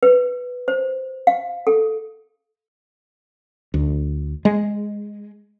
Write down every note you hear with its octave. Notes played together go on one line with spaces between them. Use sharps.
B4
C5
F5
A4
D2
G#3